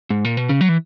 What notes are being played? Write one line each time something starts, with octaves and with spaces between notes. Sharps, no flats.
G#2
A#2
B2
C#3
F#3
E3